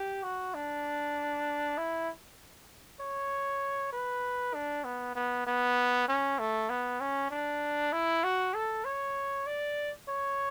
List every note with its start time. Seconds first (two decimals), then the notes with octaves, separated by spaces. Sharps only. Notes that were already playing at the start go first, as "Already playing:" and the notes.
Already playing: G4
0.23 F#4
0.54 D4
1.77 E4
3.00 C#5
3.93 B4
4.54 D4
4.85 B3
5.15 B3
5.47 B3
6.08 C#4
6.39 A3
6.70 B3
7.00 C#4
7.31 D4
7.92 E4
8.24 F#4
8.54 A4
8.85 C#5
9.47 D5
10.08 C#5